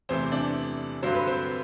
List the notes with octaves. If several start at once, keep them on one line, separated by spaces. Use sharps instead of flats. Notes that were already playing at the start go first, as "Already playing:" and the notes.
E2 C3 E3 A3 C4 C5
D4 D5
G2 D3 F#3 C5
B4
C4 C5